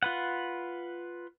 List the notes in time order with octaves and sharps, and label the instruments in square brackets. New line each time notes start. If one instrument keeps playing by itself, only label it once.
[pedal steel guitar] F4 B4 F#5